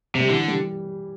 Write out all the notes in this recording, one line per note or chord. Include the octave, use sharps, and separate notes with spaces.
C3
G3
D3 E3
G3